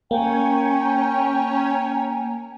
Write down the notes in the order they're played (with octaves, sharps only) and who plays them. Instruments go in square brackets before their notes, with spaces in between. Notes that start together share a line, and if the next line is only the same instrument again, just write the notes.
[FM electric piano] A#3 [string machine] C#4 C#5 [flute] G5 [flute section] G#5 A#5